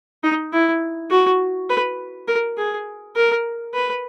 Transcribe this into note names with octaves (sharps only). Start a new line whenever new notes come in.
D#4
E4
F#4
B4
A#4
G#4
A#4
B4